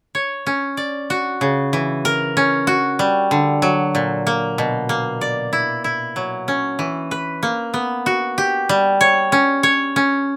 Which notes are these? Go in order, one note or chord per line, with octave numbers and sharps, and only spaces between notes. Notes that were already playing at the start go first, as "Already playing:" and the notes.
C#5
C#4
D5
F#4
C#3
E3
A#4
C#4
F#4
G3
D3
F#3
A#2
A#3
B2
A#3
D5
E4
E4
F#3
C#4
E3
B4
A#3
B3
F#4
G4
G3
C#5
C#4
C#5
C#4